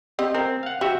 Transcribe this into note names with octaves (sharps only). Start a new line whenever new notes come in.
C4 G4 D#5
C4 A#4
F5 F#5
F#4 G4 E5 F#5